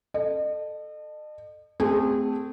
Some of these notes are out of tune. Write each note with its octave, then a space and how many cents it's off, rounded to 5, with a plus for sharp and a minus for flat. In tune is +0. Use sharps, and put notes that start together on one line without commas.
A4 +0 D#5 -40
A3 +0 C4 -25 G#4 -30